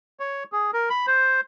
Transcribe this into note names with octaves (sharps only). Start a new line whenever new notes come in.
C#5
G#4
A#4
B5
C5